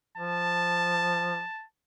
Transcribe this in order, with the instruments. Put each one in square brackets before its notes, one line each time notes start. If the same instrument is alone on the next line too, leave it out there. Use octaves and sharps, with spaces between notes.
[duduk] F3 [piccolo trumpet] A5